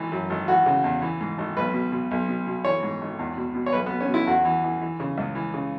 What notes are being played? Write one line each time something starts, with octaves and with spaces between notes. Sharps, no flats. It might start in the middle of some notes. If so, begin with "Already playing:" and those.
Already playing: G#1 E3
F#2
G#1
E3 F#4
C#3
E2
E3
G#2
G#1
B1 B4
B2
B2
B1
B2
B2
E3 C#5
G#2
G#1
E2
B2
B2
C#5
B1 B4
B3
B2
C#4
B2
E4
E2 F#4
E3
E3
E3
C#3
C#2
E3
C#3